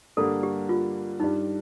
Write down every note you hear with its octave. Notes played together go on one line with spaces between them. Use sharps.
G2 D3 G3 A#3 D4 A4
G4
F4
G2 D#3 G3 D4 D#4